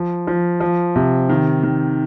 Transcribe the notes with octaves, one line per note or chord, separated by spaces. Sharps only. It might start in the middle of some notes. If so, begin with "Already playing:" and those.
Already playing: F3
F3
F3
C3
D#3
D#3